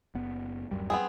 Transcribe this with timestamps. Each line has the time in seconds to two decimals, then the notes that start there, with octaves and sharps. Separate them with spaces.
0.15 F#1 B3
0.71 D1 F#2 G3
0.90 B3 C4 G#4